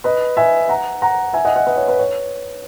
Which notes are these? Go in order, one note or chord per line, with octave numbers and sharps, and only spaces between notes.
B4 D#5
E5 G#5
F#5 A#5
F#5 A#5
E5 G#5
D#5 F#5
D#5 F#5
B4 D#5
C#5
B4
C#5